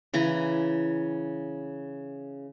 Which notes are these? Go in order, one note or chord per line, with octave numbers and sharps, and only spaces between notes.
C#3 E3 A#5